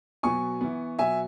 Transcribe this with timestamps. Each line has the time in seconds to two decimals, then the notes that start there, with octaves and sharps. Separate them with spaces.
0.23 B2 F#3 B3 G#5 C#6
0.61 E3 B3
0.99 B2 F#3 B3 E5 G#5